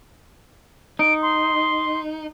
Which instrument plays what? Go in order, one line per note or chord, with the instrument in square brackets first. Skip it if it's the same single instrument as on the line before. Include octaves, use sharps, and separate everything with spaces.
[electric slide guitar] D#4 [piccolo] D7
[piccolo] C6